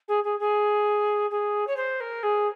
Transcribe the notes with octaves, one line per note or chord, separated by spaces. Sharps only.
G#4
G#4
G#4
G#4
C#5
C5
A#4
G#4